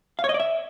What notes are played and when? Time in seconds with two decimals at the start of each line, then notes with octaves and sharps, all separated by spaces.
0.19 F5
0.24 C#5
0.29 D#5
0.34 D5
0.40 E5